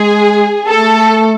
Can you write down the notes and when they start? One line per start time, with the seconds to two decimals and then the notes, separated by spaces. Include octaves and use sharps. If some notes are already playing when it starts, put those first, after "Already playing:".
Already playing: G#3 G#4
0.68 A3 A4